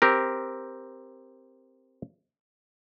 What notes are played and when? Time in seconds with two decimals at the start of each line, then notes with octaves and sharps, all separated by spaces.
0.02 C4 G4 A#4